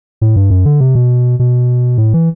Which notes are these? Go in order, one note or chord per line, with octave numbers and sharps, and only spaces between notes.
A2
G2
F#2
D3
C3
B2
B2
A2
E3